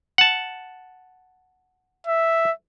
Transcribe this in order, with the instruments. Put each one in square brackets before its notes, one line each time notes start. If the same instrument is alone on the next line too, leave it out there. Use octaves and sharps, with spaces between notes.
[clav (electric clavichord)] F#5 A5
[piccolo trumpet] E5